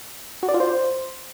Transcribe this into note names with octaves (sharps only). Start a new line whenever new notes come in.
F#4
D5
F4
C5